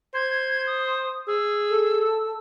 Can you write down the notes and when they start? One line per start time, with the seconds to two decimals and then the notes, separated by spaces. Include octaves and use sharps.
0.14 C5 G#6
0.67 D#6
1.28 G#4 E6
1.70 A4